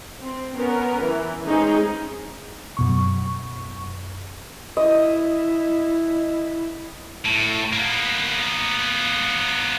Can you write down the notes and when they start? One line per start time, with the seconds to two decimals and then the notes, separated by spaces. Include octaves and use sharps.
0.21 C4
0.55 B3 C#4 A#4
1.02 E3
1.45 G#3 C4 C#4 D#4 G#4
2.77 F#2 B2 C#6
4.77 E4 D#5
7.25 A2
7.73 A#3 B3